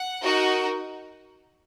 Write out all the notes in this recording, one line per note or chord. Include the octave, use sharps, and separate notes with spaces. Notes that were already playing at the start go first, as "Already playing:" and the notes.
Already playing: F#5
D#4 F#4 A#4